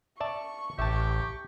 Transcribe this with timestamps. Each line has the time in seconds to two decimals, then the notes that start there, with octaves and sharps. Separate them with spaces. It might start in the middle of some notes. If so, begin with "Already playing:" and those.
0.20 D5 E5 A5 C#6
0.79 A1 G4 E5 A5